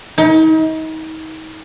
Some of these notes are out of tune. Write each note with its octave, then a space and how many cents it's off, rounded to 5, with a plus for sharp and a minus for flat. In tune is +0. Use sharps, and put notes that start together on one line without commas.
D#4 +35